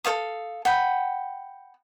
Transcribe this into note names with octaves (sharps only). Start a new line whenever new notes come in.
A4 C#5 F5 D#6
F#5 G5 B5